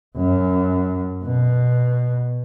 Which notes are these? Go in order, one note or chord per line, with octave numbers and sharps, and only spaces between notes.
F#2
B2